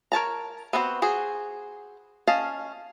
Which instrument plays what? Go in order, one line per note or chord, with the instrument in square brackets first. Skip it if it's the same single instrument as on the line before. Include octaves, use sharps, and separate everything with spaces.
[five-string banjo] A#4 C#5 A5 A#5
B3 C4 F#4 G#4 C5
F#4 G#4 C5
C#4 D#5 F5 A5